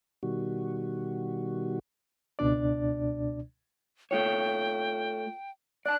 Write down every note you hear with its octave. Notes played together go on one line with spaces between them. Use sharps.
B2 D#3 G3 F#4
C#2 B2 D4 D5
A3 F4 C#5 G5
D5 A5 F#6